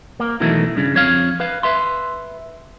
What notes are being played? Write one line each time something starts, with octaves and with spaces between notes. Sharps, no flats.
A#3
B2 D#3 E3 F#3 A3
G2 C#3
F2 C#5 F5
B4 F5
B4 E5 C6